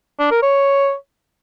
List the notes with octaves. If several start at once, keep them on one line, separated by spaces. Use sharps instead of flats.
D4
A#4
C#5